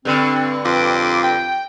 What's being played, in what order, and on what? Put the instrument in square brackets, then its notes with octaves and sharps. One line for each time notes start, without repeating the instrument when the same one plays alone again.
[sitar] G2 D3 [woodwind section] C4
[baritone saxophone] F2 [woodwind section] C6 D6
[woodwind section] G5